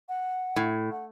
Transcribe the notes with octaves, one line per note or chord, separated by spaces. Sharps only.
F#5
A2
F#5